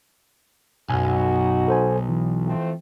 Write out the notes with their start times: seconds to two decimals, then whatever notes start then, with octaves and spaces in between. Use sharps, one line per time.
0.89 B1 F#2 D#4 F#4 G#5
1.68 A4 C5 G#5
2.09 E3
2.46 F3 A3 C4